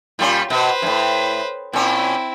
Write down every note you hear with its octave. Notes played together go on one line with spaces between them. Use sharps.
A#2 G3 C#4 F4
B2 B4 C5
F#2 A2
A#2 C4 C#4 E4